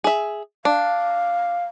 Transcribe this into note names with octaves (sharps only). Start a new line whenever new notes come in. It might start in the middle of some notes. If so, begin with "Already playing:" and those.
G#4 E5
D4 F5